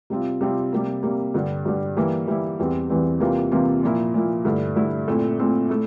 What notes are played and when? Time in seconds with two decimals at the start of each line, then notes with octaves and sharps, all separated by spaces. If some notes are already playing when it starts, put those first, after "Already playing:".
0.10 C3 G3 C4 F4
0.41 C3 G3 C4 F4
0.73 C3 G3 A#3
1.03 C3 G3 A#3
1.34 G2 D3 G3
1.65 G2 D3 G3
1.97 E3 G3 A#3 E4
2.27 E3 G3 A#3 E4
2.59 E2 E3 G3 C4
2.89 E2 E3 G3 C4
3.20 C3 E3 G3 A#3 F4
3.52 C3 E3 G3 A#3 F4
3.83 A#2 F3 A#3 E4
4.14 A#2 F3 A#3 E4
4.45 G2 D3 A3 E4
4.76 G2 D3 A3 E4
5.08 A#2 A3 C4 E4
5.39 A#2 A3 C4 E4
5.69 A3 E4